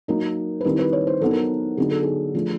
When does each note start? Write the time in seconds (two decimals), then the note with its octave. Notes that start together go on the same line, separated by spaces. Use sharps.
0.08 F#3 A#3 D#4 A#4
0.61 B4
0.64 D#3 G3 C4 E4 A#4
0.79 B4
0.93 C#5
1.07 C5
1.21 F#3 B3 D#4 A4
1.31 A#4
1.39 A4
1.77 D3 F#3 B3 D#4 G#4
1.91 A4
2.03 G#4
2.34 F3 A3 D4 F4